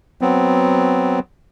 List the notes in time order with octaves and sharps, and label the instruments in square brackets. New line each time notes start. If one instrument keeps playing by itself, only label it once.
[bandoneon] F#3 B3 C4